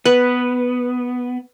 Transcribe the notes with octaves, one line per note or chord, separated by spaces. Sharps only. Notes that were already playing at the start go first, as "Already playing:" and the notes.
B3 B4